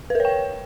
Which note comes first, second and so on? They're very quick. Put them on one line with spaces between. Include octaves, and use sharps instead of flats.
B4 A#4 C#5 G5